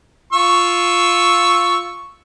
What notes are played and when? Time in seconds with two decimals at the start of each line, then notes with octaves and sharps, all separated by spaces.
0.33 F4 C#6 E6